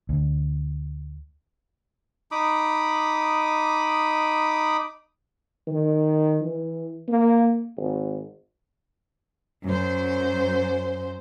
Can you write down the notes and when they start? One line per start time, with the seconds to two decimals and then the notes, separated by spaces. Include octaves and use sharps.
0.09 D2
2.31 D#4 B5 D6 D#6
5.67 D#3
6.42 E3
7.08 A#3
7.77 G#1
9.65 F#2 C5